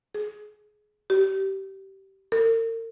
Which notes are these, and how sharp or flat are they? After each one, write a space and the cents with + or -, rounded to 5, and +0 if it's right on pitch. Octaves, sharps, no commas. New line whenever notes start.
G#4 +20
G4 -25
A#4 -40